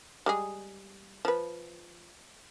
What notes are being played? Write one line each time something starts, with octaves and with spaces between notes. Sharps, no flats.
G3 G#3 G#4
F3 B4